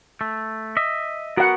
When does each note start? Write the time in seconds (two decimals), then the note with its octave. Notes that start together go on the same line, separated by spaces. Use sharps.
0.21 A3
0.77 D#5 E5
1.37 B3 F#4 A#4 F#5